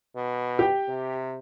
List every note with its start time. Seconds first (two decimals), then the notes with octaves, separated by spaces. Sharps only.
0.16 B2
0.59 G4 G5
0.88 C3